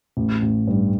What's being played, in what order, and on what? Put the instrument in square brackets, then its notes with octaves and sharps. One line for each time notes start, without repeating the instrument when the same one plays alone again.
[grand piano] A1
A1
G2